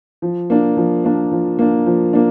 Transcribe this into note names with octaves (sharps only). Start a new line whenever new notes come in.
F3
A#3 D4
F3
A#3 D4
F3
A#3 D4
F3
A#3 D4